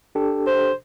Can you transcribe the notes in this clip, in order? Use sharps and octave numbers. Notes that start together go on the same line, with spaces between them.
D4 G4 A4
C5